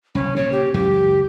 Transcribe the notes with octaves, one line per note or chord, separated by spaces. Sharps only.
F#1 C2 C#4
A#2 C#3 C#5
G4
C#2 F#2 E3 G4